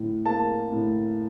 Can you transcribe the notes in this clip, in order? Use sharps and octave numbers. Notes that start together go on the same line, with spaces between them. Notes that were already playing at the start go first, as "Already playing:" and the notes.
Already playing: A2
A#3 A5
A2